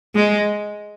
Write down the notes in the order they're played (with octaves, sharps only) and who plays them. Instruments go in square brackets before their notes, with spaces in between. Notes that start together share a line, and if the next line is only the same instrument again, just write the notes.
[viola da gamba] G#3